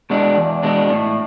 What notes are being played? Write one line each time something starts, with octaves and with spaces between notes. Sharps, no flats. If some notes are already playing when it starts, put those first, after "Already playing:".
B2 G#3 D4
E2
B2 G#3 D4
A2